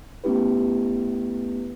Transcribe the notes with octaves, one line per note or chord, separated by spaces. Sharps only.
A3 B3 C#4 E4 G4 B4